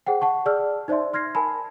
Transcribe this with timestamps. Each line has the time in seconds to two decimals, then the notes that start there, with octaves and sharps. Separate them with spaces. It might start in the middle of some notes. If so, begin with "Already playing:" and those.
0.06 G#4 C5 F#5 G5
0.21 F#5 A5 C#6
0.46 G#4 D5 A5 E6 F6
0.88 D#4 C5 D5 E5 C6
1.13 C6 F6 G#6 A#6 C7
1.35 A#4 G#5 A5 B5